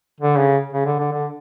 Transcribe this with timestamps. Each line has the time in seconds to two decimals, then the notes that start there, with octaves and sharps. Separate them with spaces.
0.20 D3
0.38 C#3
0.73 C#3
0.86 D3
0.99 D3
1.13 D3